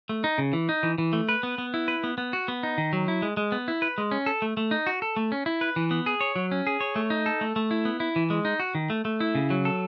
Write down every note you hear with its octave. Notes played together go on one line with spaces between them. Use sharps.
A3
D#4
C#3
E3
D#4
E3
E3
A3
B4
B3
B3
E4
B4
B3
B3
F#4
B3
D#4
D#3
F#3
E4
G#3
G#3
B3
E4
B4
G#3
C#4
A4
A3
A3
D#4
F#4
A4
A3
C#4
E4
B4
E3
B3
G#4
C#5
F#3
C#4
G#4
C#5
A3
D#4
A4
A3
A3
E4
B3
E4
E3
G#3
D#4
F#4
D#3
A3
A3
E4
C#3
F#3
A4